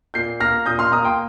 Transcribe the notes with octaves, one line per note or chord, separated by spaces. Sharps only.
A#2 G6 C7
A#3 F6 A#6
A#2 D#6 G6
C6 F6
A#3 A#5 D#6
G5 C6